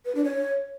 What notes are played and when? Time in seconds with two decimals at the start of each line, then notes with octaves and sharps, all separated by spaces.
0.05 B4
0.15 D4
0.24 C#5